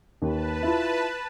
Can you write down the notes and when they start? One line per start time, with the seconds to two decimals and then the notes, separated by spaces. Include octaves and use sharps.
0.22 D#2 B4 A5
0.63 E4 F4